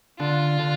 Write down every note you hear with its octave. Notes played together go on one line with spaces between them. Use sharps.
D3 F4
D3